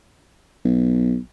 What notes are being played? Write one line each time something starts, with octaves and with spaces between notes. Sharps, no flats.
B1